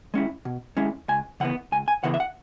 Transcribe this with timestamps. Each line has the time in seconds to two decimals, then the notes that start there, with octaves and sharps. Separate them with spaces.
0.14 G#3 C#4 E4
0.45 B2
0.77 G#3 C#4 E4
1.08 C#2 G#5
1.40 C#3 E3 B3 F#5
1.72 C#2 G#5
1.88 G#5
2.03 C#3 E3 B3 F#5
2.14 E5
2.20 F#5